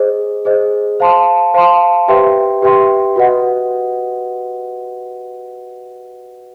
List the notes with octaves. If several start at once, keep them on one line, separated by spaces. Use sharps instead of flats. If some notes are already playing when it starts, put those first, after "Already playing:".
Already playing: G#4 C5 D#5
G#4 C5 D#5
C5 F5 A5 C6
C5 F5 A5 C6
G4 B4 E5 G5 C6
G4 B4 E5 G5 C6
F#4 B4 D#5 F#5